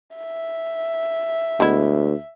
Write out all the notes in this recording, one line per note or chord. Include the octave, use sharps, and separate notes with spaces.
E5
D2 G#3 B3 E4